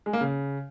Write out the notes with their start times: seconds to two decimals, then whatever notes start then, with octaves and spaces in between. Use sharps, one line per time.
0.06 G#3
0.13 A#3
0.21 C#3